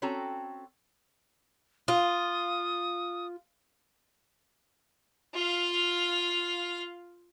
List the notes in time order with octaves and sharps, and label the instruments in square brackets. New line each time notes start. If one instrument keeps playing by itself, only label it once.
[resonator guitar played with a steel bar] C4 C#4 F#4 A4 G5 A#5
[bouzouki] F4 [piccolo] D#6
[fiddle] F4 F5